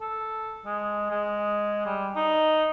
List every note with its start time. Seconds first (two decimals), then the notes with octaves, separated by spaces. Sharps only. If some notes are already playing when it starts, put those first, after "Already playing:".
0.01 A4
0.65 G#3
1.11 G#3
1.86 G3
2.16 D#4